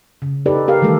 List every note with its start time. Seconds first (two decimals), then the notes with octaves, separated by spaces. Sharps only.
0.22 C#3
0.46 D#4 G4 A4 B4 D5
0.68 G4 A#4 F5
0.82 D#3 E3 G3 A3 A4